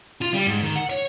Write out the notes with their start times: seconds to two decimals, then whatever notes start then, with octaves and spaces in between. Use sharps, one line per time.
0.21 F4
0.34 G3
0.47 G#2
0.62 D#3
0.76 F#5
0.90 C#5